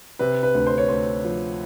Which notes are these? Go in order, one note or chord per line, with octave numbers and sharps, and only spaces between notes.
C3 B4
B4
D2
C5
C#5
D2 C5
F3